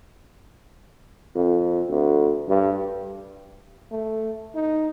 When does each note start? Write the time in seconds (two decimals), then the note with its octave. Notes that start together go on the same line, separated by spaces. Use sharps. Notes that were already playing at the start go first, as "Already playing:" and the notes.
1.35 F2
1.88 D2
2.48 G2
3.91 A3
4.55 D#4